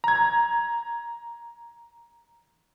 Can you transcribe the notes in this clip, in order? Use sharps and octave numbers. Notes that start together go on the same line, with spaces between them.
A#5 G#6